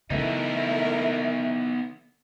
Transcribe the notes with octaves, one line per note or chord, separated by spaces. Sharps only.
C#3 E3 A3 B3 D#4 E4 A#4 E5